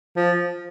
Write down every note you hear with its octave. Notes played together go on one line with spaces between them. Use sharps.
F3